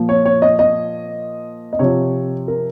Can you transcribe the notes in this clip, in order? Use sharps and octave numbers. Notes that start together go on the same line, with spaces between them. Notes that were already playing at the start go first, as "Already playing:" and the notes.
Already playing: A#2 F3
C#5
C#5
D#5
D#5
D#5
C3 F3 C#5
A#4